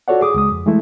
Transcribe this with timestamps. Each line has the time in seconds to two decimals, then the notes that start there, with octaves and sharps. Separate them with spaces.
0.08 F4 F#4 A4 C#5 D5 F#5
0.21 G#4 D6 D#6
0.34 C#2 G#3 D#6
0.52 F2
0.66 E3 G#3 A3 E4